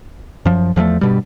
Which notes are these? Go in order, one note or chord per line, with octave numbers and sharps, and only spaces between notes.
F#2 F3
E2 F3 F#3 A3
G2 B2 G3